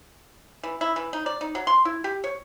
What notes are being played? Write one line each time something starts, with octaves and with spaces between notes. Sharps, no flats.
E3
E4
E3
D#4
D5
D#4
F#3
C6
E4
G4
C#5